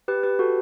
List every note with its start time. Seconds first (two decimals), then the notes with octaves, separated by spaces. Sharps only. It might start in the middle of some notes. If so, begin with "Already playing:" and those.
0.08 G4 B4
0.23 G4 B4
0.39 F#4 A4